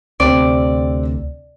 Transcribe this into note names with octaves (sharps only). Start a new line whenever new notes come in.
D2 C3 C4 D5